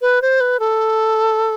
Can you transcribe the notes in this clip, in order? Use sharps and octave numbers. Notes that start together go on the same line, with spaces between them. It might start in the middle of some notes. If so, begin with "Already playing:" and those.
B4
C5
B4
A4